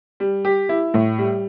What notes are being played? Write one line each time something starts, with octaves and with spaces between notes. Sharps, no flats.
G3
G4
E4
A2
G3